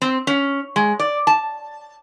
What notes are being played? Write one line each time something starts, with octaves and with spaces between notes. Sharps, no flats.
C4
C#4
G#3
D5
A5